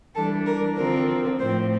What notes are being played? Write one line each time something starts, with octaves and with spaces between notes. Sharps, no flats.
E3 G3 D4 A4
A#4
D3 F3 C4 A#4
A2 F3 C4 C5